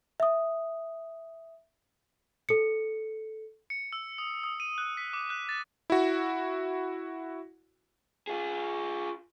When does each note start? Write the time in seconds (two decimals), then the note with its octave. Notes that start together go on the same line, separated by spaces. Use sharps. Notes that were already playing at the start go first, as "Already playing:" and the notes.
0.20 E5 D#6
2.49 A4 C#7
3.70 C#7
3.93 E6
4.18 D#6
4.44 D#6
4.60 D#7
4.78 F#6
4.97 B6
5.13 D6
5.30 F#6
5.49 A6
5.90 E4 F#4
8.27 F4 G#4